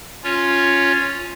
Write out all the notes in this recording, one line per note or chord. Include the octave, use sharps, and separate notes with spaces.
C#4 F4 C#5